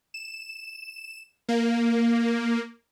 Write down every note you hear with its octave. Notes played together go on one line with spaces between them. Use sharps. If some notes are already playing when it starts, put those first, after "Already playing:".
E7
A#3